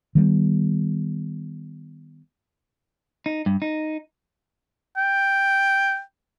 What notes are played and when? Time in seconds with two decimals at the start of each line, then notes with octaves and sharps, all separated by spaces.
0.15 D#3 G3 A#3 B3
3.26 D#4
3.46 G2
3.62 D#4
4.97 G5